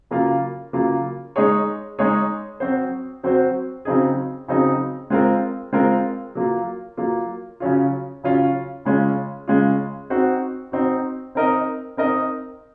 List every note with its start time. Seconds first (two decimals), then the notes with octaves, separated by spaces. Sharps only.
0.11 C#3 F#3 A#3 F4
0.73 C#3 F#3 A#3 F4
1.36 G#3 D#4 G#4 C#5
1.99 G#3 D#4 G#4 C#5
2.60 F#3 C4 F#4 C5
3.23 F#3 C4 F#4 C5
3.85 C#3 F#3 C4 D#4 G#4
4.48 C#3 F#3 C4 D#4 G#4
5.10 G#3 C4 F4 A#4
5.73 G#3 C4 F4 A#4
6.35 F#3 A#3 F4
6.97 F#3 A#3 F4
7.60 C#3 F#3 C#4 F4
8.23 C#3 F#3 C#4 F4
8.85 C#3 G#3 C#4 F4
9.48 C#3 G#3 C#4 F4
10.10 C4 D#4 F#4
10.72 C4 D#4 F#4
11.35 C4 D#4 A#4 D#5
11.97 C4 D#4 A#4 D#5